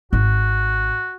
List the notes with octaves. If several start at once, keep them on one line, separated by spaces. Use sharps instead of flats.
G#1 F#4